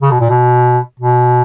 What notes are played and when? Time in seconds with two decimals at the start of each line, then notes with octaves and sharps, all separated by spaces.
0.02 C#3
0.11 B2
0.20 A#2
0.30 B2
1.00 B2